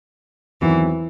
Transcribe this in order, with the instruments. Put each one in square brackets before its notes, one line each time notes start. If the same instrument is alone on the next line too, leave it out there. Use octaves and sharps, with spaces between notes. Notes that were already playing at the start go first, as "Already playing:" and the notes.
[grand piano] E2 D#3 F#3 C4 [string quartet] E3